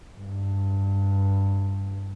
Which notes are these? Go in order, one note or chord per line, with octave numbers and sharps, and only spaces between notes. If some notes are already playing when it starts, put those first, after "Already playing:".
G2